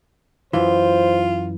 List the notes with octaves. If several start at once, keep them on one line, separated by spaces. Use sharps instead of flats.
F#2 E3 F4 C5